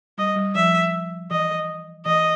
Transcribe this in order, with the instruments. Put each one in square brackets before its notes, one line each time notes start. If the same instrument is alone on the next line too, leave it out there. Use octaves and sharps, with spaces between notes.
[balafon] G3 [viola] D#5
[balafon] G3
[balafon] F3 [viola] E5
[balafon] E3 [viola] D#5
[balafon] E3 [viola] D#5